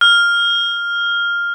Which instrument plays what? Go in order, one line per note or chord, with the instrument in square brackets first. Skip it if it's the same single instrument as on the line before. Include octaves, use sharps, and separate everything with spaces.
[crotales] F6